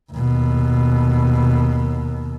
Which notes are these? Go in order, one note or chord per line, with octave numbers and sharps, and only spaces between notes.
D#2 B2